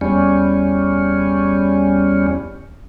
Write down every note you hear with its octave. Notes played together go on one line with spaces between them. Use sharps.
E2 G3 C#4